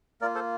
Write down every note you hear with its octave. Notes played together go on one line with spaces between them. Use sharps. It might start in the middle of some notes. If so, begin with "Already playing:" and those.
A#3 F4 A#4 D5
A4 C5